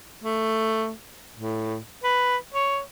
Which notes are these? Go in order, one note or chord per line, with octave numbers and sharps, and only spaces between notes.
A3
A2
B4
C#5